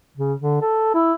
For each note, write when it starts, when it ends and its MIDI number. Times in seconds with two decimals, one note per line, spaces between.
0.17 0.34 49
0.40 0.59 50
0.62 0.90 69
0.94 1.13 64